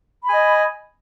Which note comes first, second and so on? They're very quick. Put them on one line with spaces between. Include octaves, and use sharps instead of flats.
B5 G#5 D#5